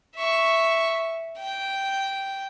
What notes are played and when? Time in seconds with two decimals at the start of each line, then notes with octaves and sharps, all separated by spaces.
0.16 E5 C#6
1.38 G5